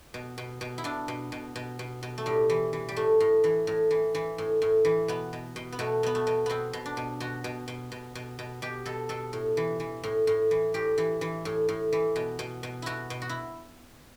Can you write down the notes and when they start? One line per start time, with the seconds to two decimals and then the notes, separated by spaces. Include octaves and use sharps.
0.14 B2
0.38 B2
0.61 B2
0.78 E4
0.84 B2 D4
1.08 B2
1.32 B2
1.56 B2
1.79 B2
2.03 B2
2.18 A3
2.26 A2 G3
2.50 E3
2.73 E3
2.89 G3
2.96 A2 A3
3.20 A2
3.44 E3
3.67 A2
3.91 E3
4.15 E3
4.38 A2
4.62 A2
4.85 E3
5.08 B2 B3
5.33 B2
5.56 B2
5.72 B3
5.79 B2 A3
6.03 B2 B3
6.15 A3
6.27 B2
6.46 B2 B3 C4
6.73 B2
6.86 D4
6.97 B2
7.20 B2 F#4
7.44 B2
7.68 B2
7.92 B2
8.15 B2
8.39 B2
8.62 B2 G4
8.86 B2 A4
9.09 B2 A4
9.33 A2
9.57 E3
9.80 E3
10.04 A2
10.27 A2
10.51 E3
10.74 A2 G4
10.98 E3
11.21 E3
11.45 A2
11.69 A2
11.93 E3
12.16 B2
12.39 B2
12.63 B2
12.82 B2 E4 F#4
13.10 B2
13.22 F#4
13.29 E4